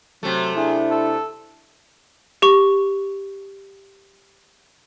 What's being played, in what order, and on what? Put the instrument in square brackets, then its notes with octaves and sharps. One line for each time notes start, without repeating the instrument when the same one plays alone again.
[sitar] C3 A3 [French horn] F#3
[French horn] D4 [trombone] E4 [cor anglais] G#4
[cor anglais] A4
[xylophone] G4 C#6